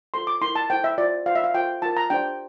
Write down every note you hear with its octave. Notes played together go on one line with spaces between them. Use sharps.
F4 A4 C5 C6
D6
E4 A#4 C6
A5
E4 A4 C5 G5
E5
F4 C5 D5
F4 C5 F5
E5
F5
F4 A4 C5 G5
F4 A#4 A5
A#5
D4 G4 C5 G5